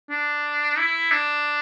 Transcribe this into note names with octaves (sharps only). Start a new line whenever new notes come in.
D4
E4
D4